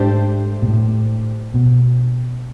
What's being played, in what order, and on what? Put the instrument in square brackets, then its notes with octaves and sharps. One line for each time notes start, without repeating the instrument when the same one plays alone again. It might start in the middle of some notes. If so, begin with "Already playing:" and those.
Already playing: [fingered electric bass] G#2 [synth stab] A3 D4 G4 C5
[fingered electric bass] A#2
A2
B2